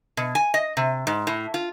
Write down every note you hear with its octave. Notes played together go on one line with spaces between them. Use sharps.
B2
G#5
D#5
C3
G#2
A2
F4